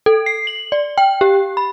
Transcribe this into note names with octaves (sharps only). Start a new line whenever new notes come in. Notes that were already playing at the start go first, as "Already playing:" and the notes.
A4
C7
F#7
D5
G5
G4
B5